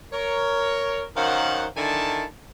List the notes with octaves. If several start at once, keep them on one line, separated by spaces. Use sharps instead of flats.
A#4 C#5
F#2 D#3 C5 F5 F#5
D3 D#3 E4 G#5 A5